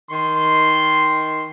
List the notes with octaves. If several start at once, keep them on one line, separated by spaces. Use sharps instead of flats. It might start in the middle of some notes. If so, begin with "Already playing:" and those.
D#3 C6